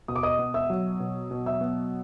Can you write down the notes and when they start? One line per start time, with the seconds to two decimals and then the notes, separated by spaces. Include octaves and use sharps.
0.08 B2 D#6
0.16 D6
0.23 D#5 D#6
0.39 B3
0.54 E5 E6
0.70 F#3
1.00 B2
1.31 B2
1.46 E5 E6
1.61 B3